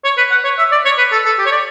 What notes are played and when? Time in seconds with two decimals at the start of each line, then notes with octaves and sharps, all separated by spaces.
0.04 C#5
0.17 B4
0.31 F#5
0.44 C#5
0.58 E5
0.72 D5
0.85 C#5
0.98 B4
1.12 A4
1.25 A4
1.39 G4
1.46 C#5
1.52 D5